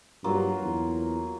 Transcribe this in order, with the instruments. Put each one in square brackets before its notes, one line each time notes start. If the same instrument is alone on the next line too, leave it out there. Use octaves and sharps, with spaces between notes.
[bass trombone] G2 [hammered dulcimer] F#3 A#3 F4
[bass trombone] E2